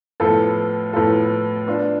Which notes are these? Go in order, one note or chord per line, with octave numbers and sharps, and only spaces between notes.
A2 F3 B3 F4 A4
A2 F3 B3 F4 A4
B3 D4 F4